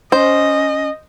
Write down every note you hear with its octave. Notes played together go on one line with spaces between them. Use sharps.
C#4 C5 D#5